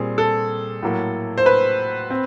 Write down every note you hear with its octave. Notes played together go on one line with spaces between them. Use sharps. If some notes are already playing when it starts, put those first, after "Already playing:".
Already playing: A#2 G3 C4 G#4
A4
A2 F#3 A#3
C5
B4
C4